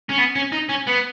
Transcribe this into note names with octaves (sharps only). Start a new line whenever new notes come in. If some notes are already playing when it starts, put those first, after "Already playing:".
C#4
B3
C#4
D#4
C#4
B3